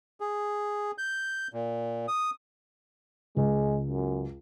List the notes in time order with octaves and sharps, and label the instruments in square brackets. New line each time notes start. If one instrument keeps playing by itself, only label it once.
[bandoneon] G#4
G6
A#2
D#6
[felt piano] C#2 [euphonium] G#3
[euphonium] F#2